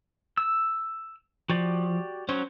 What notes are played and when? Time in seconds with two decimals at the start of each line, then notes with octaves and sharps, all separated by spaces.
0.37 E6
1.50 F3 F#4 G4 D5
2.29 F#3 C#4 C5